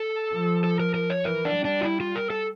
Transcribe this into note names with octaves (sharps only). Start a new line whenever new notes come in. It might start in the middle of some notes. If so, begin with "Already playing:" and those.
Already playing: A4
F3
A4
A#4
A#4
C#5
E3 A#4
D4
G3
D4
F4
E4
F4
A#4
A4